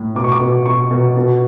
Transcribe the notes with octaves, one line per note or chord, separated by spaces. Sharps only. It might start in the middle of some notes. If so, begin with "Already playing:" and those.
Already playing: A2
B2 D6
C#6
D6
B2
B2 C#6
B2
B2